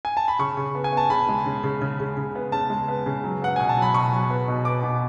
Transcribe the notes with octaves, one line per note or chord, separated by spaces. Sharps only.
G#5
A5
B5
C#3 C#6
C#3
B3
G#5
B3 A5
C#3 B5
G#3
C#3
C#3
C#3
C#3
C#3
B3
C#3 A5
G#3
B3
C#3
F#3
B3 F#5
B2 G#5
A5
F#3
B5
B2 C#6
F#3
B3
B2
B3 D6
B2